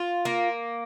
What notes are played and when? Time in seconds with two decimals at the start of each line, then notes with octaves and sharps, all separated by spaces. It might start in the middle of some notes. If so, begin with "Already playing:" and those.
Already playing: F4
0.25 A#3